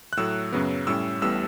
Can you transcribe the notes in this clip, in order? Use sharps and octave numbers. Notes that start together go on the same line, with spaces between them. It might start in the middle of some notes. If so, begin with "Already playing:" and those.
F#6
A2 F#3 A3 E6
F#2 C#3 F#3 B3
A2 G3 C#4 E6
A1 A2 G3 B3 E6